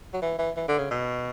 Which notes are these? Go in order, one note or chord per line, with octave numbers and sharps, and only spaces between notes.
F#3
E3
E3
E3
D3
C#3
B2